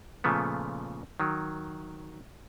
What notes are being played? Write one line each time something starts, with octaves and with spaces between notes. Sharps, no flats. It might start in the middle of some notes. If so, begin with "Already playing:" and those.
A#2 C#3 F3 A3 B3
D#3 F#3